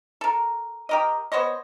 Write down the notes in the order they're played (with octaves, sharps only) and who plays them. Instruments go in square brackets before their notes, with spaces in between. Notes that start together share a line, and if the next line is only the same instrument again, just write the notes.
[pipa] A4 A#4
G4 A#4 D#5
B3 C5 C#5 D#5